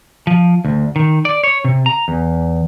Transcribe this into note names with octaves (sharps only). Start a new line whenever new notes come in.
F3
D2
D#3
D5
C#5
C3
A#5
E2